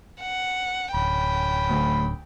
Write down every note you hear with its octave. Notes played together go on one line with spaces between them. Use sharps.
F#5
D1 C#4 G5 B5
D2